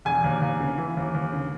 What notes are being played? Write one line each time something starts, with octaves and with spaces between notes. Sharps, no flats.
E1 G#5
D#2
D#2
C#3
E3
D#2
D#2
C#3